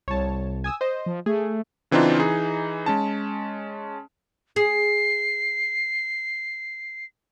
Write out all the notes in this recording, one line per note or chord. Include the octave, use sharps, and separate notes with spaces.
C2 C#5 A5
G#5 D#6 E6
C5 D#5
F3
A3 G#4
C#3 E3 C4 D4 D#4 F4
E3 D#4 G#4
G#3 C#4 A5
G#4 C7